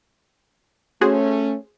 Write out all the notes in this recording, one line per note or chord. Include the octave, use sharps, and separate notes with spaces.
A3 C#4 F#4 G#4 C5